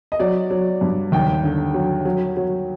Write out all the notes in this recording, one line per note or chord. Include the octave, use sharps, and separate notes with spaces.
D#5
F#3 D5
F#3
G2
D#2 G5
D3
F#3
F#3
F#3